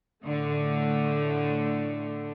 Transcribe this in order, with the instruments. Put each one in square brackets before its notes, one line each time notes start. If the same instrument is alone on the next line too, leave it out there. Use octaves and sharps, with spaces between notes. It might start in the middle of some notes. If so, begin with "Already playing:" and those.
[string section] A2 D3 A3